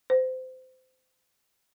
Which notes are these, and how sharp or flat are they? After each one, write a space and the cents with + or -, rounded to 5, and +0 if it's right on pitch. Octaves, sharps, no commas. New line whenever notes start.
C5 -25